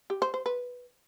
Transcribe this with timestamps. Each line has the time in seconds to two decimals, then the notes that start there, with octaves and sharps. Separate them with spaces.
0.10 G4
0.22 C5
0.34 C5
0.46 B4